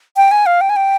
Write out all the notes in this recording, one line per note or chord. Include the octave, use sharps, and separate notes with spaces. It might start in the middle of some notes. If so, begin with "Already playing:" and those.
G5
G#5
F5
G5
G#5
G5